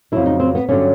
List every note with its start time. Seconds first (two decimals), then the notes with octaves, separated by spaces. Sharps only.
0.12 F2 C#3 F#3 E4
0.26 D#4
0.40 C4
0.55 B3
0.69 G2 D3 F#3 C#4